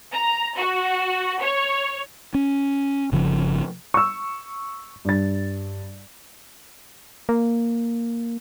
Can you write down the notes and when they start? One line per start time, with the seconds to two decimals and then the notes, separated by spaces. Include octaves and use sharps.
0.12 A#5
0.58 F#4
1.41 C#5
2.34 C#4
3.12 G1 C#3 F3
3.94 C#6 E6
5.05 G2 A6
7.29 A#3